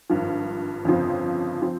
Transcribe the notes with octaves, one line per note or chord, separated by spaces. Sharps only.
G#1 G2 F3
G1 F2 C#3 F3 C4
F3 C4